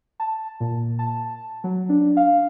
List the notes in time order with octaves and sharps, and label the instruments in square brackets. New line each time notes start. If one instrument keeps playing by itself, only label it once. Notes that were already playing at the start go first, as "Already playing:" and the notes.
[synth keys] A5
A#2
A5
F#3
D4
F5